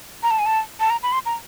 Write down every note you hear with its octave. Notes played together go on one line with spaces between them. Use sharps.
A#5
A5
G#5
A5
A5
A#5
B5
C6
A#5